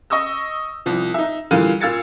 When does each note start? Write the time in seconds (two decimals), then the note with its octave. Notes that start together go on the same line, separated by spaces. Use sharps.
0.10 D#5 C#6 D#6 E6
0.86 C2 F3
1.14 D#4 E5
1.51 A#2 D3 E3 G3 F5 D#7
1.80 A#2 F5 E6 G#6 A6 C#7